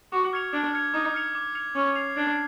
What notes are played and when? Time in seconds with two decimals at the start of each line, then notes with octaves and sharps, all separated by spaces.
0.12 F#4 D6
0.33 F6 G#6 C#7 F7
0.53 D4 D6
0.74 F6 G#6 C#7 F7
0.94 D#4 D6
1.14 F6 G#6 C#7 F7
1.35 D6
1.55 F6 G#6 C#7 F7
1.75 C#4 G#6
1.96 C7 F7
2.16 D4 G#6